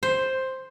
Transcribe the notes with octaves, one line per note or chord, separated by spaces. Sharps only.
C5